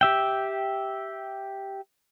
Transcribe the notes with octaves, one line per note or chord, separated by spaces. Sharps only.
G4 E5 G5